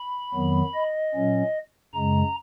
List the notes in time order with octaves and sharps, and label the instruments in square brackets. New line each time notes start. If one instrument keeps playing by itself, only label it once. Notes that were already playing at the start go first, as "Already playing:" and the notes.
Already playing: [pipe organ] B5
F2 D#3 F#3 B3
D#5
A#2 F#3 C#4
F#2 C#3 G#3 A#5